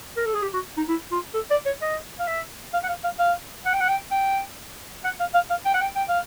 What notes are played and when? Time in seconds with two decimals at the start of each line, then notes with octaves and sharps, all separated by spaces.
0.16 A#4
0.25 A4
0.33 G#4
0.42 G4
0.53 F#4
0.77 D#4
0.88 E4
1.11 F4
1.34 A4
1.51 D5
1.66 C#5
1.81 D#5
2.19 F5
2.27 E5
2.73 F5
2.84 F#5
2.88 F5
3.04 F5
3.19 F5
3.65 F#5
3.73 G5
3.80 F#5
3.88 G5
4.11 G5
5.04 F#5
5.20 F5
5.34 F5
5.50 F5
5.65 G5
5.74 F#5
5.81 G5
5.95 G5
6.08 F5